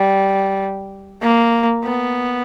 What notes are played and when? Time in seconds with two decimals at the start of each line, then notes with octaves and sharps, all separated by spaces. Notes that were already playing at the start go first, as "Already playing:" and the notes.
Already playing: G3
1.21 A#3
1.84 B3